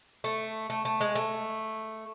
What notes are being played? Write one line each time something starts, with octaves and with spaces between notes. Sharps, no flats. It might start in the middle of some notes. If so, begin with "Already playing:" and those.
A3
A3
A3
G#3
A3